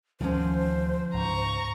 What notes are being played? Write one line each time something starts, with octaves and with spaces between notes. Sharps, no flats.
D2 D#3 F3 C#4 C5
C#2 G#2 A#5 C#6